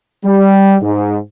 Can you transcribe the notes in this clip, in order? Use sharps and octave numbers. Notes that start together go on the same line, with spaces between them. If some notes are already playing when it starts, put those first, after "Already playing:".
G3
G#2